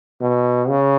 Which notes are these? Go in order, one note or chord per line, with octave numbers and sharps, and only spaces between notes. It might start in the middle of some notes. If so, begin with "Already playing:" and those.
B2
C#3